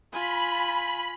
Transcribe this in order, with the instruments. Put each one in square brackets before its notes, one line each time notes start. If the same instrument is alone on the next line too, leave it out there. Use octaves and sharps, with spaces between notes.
[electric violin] F4 G#5 [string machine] B5